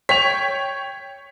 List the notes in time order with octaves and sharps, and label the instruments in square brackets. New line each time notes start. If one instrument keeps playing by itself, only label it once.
[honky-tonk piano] C#5 G5 C#6 [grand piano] B6 F7